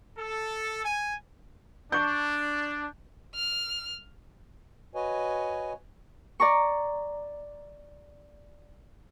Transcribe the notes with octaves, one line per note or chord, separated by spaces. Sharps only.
A4
G#5
D4 C#6 G6
F6
F#4 B4 C#5 D#5 G#5
D5 A#5 C#6